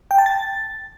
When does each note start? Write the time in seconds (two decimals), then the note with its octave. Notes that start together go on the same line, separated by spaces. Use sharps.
0.11 G5
0.18 A5
0.26 A6